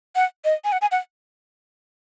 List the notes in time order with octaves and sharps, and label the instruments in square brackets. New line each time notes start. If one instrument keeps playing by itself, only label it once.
[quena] F#5
D#5
G#5
F#5
G#5
F#5